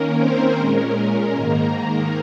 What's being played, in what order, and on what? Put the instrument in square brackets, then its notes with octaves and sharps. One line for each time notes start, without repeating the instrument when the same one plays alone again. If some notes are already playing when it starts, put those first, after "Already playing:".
Already playing: [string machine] D#3 A#3 C#4 A#4
C4 C5
A#2 G#3 C#4 A#4
G#2 D#3 A#3
A#4